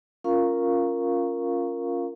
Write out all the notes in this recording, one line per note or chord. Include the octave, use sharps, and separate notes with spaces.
C#4 F4 A#4 F5 A#5 C#6